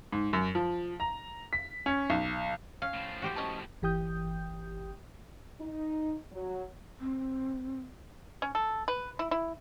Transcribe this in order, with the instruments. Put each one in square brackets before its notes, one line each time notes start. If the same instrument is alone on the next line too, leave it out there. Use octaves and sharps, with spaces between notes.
[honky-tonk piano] G#2
F#2
F3
A#5
B6
C#4
B1
[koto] C#4 [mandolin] F5
[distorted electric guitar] A2 F3
[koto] F#4 G4 C5
[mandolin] C#4 D#5 A5
[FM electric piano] G1 E3 G4 G5 D#6 G6
[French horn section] D#4
F#3
[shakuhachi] C4
[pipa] C#4
A4
B4
E4
E4